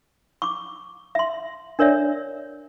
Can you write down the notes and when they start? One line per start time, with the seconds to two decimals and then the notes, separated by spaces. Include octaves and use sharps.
0.42 C#6 D6
1.15 E5 C6
1.79 D4 A#4 C#5 D5 E5